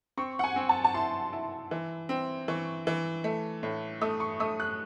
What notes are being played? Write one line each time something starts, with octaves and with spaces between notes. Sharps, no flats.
C4 C#6
F#5
G#5
C4
A5
A5
E4 C6
E4
E3
C4
E3 C#6
E3
A3
A2
A3 D#6
C#6
A3 D#6
F#6